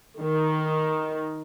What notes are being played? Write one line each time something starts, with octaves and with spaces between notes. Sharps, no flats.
D#3